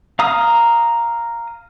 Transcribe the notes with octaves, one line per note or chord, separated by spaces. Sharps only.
F5 A#5 D#6